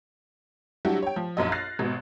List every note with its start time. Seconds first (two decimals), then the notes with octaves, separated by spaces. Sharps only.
0.85 F#3 G3 D4 E4 F#4 G4
1.02 C#5 G5
1.16 F3
1.37 A#1 F#2 D#5
1.52 F6 F#6 A6 A#6 C7
1.79 G#1 B2